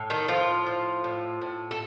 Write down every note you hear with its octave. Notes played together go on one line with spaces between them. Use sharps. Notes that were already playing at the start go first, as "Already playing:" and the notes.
Already playing: A2
D#3 D#4
A2 F3 F4
F3
A2
A2
A4